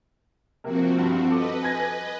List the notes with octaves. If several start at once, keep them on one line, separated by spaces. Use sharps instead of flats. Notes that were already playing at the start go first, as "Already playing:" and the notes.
C3 F3 A#3 C4 F#4
G2
A4 B4 D#5 D6
G#5 G#6 A#6